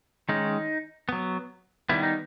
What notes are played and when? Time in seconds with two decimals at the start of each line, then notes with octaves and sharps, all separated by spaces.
0.29 D#3 G#3 C#4 D#4
1.09 F#3 B3
1.89 D#3 G3 B3 E4
2.03 D#4